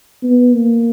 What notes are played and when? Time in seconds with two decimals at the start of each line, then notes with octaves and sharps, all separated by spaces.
0.23 B3
0.54 A#3